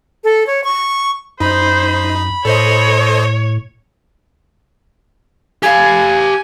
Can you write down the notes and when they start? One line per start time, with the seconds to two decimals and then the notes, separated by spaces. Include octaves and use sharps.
0.24 A4
0.47 C#5
0.64 C#6
1.40 F#2 D#4 C5 B5
2.45 A2 A4 C5 C#5 D#5
5.63 G4 F5 G#5